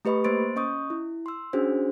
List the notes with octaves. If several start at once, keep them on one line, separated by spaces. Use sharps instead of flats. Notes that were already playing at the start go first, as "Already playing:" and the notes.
A3 G4 B4 D#5 B5 C#6
A#3 C5 C6 A6 D7
C#4 D#5 C#6 D#6 G6
E4
C6 E6
C#4 D4 F#4 G#4 C5